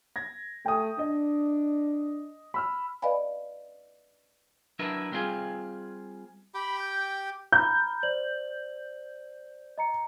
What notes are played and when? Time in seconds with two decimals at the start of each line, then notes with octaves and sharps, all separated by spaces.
0.16 G#6 A#6
0.66 A3 G5 D#6
0.99 D4 D#5
2.54 B5 E6 F6
3.02 B4 D5 D#5 F5 G#5 B5
4.79 F#3 D4 E4 A#4 B4 E5
5.12 G3 C4 F4 G#4
6.54 G4 G5 B5
6.79 G6
7.52 A#5 B5 F6 G6
8.03 C5 D5 F#7
9.78 D#5 A#5 C#7